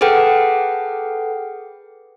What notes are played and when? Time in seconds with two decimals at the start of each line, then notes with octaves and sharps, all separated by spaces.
0.01 G#4 A4 B4 F#5 G5